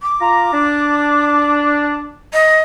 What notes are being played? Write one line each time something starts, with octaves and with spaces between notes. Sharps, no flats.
D6
F4 A#5
D4
D#5